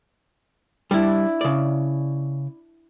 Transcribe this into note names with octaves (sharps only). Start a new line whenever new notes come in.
G3 D4 E4
C#3 D5